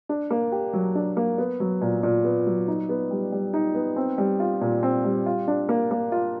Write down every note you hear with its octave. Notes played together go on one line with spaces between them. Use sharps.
D4
A#3
G4
F#3
D4
A#3
B3
F#3
A#2
A#2
B3
F#3
D#4
B3
G3
G3
D#4
B3
C4
G3
F4
A#2
C4
G3
F4
D4
A#3
A#3
F4